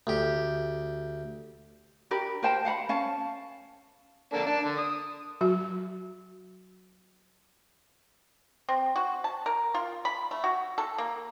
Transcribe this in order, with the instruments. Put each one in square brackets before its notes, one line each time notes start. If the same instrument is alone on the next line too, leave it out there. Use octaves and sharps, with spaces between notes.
[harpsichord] D2 G4
[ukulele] D4 G4 A#4 B5
A#4 C5 G5 A5
F5 F#5 A#5 B5
C#4 F5 A5
[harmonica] A#3 D4 A4
D4
D3
D#6
[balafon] F#3 F#4
[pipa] C4
F#4
A5
A#4
F4
B5
A3
F#4
A4
A#3